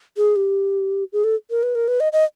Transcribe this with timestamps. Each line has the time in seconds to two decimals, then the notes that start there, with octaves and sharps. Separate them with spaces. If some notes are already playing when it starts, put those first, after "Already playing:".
0.17 G#4
0.36 G4
1.13 G#4
1.24 A4
1.50 A#4
1.63 B4
1.75 A#4
1.88 B4
2.00 D#5
2.13 D#5